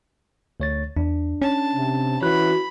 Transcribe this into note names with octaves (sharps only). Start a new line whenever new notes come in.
D2 C#5 A6
E2 D4
C#4 A5
C3
E3 F#4 C#5 B5 F#6